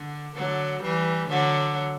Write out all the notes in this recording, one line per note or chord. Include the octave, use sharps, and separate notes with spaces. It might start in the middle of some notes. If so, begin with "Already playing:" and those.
Already playing: D3
D3 F#3
E3 G3
D3 F#3